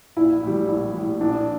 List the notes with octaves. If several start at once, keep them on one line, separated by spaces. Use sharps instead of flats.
A#1 E4
A2 G3
A#1
A2 G3
A#1 D4